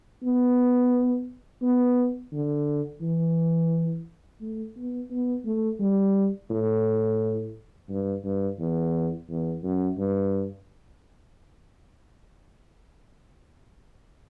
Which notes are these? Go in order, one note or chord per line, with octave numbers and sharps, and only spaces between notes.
B3
B3
D3
E3
A3
B3
B3
A3
G3
A2
G2
G2
E2
E2
F#2
G2